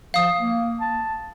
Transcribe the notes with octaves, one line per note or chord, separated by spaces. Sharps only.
F3 F5 D#6
A#3
A5